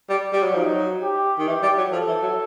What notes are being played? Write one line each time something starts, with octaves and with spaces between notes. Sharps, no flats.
G3
G3
F#3
F3 D#4
F#3
G4
D#3
E3 G4
G3
F#3
F3 A4
E3
F#3